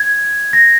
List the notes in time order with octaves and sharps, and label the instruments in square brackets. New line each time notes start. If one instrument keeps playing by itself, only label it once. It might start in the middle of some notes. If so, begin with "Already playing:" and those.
Already playing: [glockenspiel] G#6
A#6